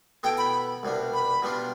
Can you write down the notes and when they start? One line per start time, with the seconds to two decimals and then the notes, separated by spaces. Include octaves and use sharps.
0.23 B2 B3 E4 A4 G5
0.38 B5
0.83 C2 B2 G3 D4
1.13 B5
1.42 B2 G3 B3 D4 F4